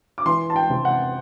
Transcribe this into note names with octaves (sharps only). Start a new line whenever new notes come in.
D6
E3 C6
A5
G5
C3
F#5